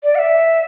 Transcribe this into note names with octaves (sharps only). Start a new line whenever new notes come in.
D5
F#5
E5